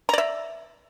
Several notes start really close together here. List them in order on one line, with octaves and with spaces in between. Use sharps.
A#5 D5 E5